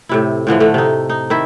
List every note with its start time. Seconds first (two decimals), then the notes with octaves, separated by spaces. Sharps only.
0.09 A2 C3 E4
0.47 A2 D3 E3 F3
0.60 D3 A3
0.74 C3 D#4
1.09 D#4
1.30 D#3 E4 E5